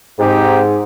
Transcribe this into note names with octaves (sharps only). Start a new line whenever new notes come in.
G#2 C4 D#4 G4